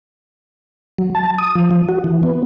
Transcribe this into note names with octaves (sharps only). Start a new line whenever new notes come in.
F#3
A5
D#6
F3
F3
F#4
E3
B3